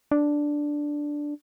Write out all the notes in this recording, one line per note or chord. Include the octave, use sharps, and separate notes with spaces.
D4